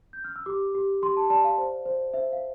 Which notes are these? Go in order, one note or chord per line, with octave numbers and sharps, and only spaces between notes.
G6
F6
E6
G4 D6
G4
G4 C6
A5
D5 A5
F5
C5
C5
C5 E5
F5